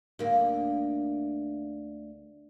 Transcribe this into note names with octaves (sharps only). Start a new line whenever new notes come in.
D2 A#3